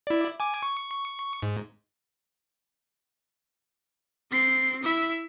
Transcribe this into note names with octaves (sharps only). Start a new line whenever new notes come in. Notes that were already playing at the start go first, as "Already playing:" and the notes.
E4 D5
G#5 D6
C#6
G#2
C4 C7
E4 E5